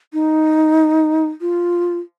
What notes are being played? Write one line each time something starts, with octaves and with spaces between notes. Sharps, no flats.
D#4
F4